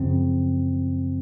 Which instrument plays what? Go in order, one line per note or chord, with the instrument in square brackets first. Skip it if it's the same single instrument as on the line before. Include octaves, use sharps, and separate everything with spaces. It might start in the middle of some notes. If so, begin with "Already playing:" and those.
Already playing: [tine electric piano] F#2 C#3 F3 C4